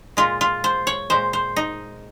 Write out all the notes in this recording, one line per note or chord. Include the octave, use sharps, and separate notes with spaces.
A#2 G#3 F4
F4
C5
C#5
A#2 G#3 C5
C5
D#4